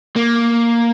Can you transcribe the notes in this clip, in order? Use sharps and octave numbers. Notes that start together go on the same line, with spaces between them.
A#3